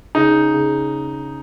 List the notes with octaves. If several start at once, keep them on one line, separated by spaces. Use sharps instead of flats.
C#3 D#4
C#3